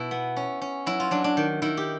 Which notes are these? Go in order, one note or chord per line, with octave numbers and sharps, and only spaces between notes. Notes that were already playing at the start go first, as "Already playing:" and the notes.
Already playing: B2 E4 B4
B3
C#4
C#4
F#3 E4
F4
F#3 D4
D4
D#3
D#3 E4
G4